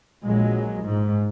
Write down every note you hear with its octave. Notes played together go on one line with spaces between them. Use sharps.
A#1 F#3 G#3
G#2